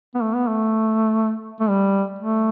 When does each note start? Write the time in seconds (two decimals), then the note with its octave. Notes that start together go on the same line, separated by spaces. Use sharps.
0.15 B3
0.22 A3
0.35 B3
0.47 A3
1.60 A3
1.70 G3
2.19 A3